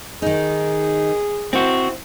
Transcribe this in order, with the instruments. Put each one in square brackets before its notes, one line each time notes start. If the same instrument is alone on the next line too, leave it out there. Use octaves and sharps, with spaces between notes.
[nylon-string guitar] D#3 D#4 [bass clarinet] G#4
[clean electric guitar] C4 F#4 [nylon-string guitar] E4 C5